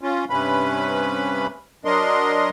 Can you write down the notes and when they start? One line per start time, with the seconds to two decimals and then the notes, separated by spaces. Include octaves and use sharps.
0.01 C#4 F4
0.30 G2 C3 C#4 B4 B5
1.85 F#3 D4 A#4 D#5 C6